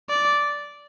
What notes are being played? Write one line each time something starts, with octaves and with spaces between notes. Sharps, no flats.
D5